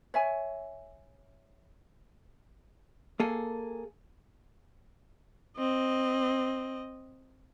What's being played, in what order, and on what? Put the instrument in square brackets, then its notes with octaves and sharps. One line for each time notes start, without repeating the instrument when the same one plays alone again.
[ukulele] C#5 E5 G#5
[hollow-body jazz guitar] A#3 G#4 A4
[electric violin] C4 D#5